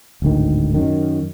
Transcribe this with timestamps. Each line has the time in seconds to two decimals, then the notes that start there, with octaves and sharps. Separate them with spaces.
0.22 D1 G#1 D2 D#3
0.74 F#2 D#3